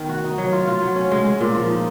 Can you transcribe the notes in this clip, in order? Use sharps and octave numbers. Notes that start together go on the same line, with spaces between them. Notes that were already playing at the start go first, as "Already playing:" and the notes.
Already playing: D#3 B3
F#4
D#4
F#3
F4
F4
F#3
C#4
G#3
G#3
A#2
F3
D#4